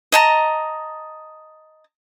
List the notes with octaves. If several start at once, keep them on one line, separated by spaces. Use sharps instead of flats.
D#5 A5 A#5